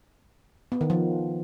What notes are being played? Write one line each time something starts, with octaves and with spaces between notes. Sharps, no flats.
B3
D#3
F3